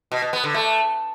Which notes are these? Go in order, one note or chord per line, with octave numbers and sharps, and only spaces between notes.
B2
B2
B3
D3
A3